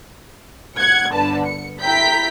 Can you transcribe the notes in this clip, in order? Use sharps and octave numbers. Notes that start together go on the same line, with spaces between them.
F#5 F#6 G#6 C#7
G1 D3 B4 A5
C#7
E4 G5 A#5 G6 B6